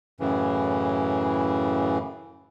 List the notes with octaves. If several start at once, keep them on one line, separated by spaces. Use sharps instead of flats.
F#2 A2 C#3 E3